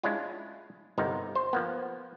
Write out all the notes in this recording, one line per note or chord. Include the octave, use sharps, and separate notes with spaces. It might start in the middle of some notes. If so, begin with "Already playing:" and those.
G#3 C#4 D4 E4 F4
G1 C3 D#4 A#4
C5
F3 A#3 B3